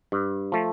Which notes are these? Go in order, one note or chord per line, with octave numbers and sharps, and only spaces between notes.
G2
F3 A3